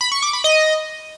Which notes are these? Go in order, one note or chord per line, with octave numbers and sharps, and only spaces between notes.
B5
C#6
D6
B5
D#5